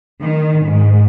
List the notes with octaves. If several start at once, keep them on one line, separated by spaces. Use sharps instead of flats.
D#3
G#2